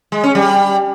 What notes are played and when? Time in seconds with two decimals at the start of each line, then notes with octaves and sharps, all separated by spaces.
0.12 G#3
0.23 C#4
0.35 G3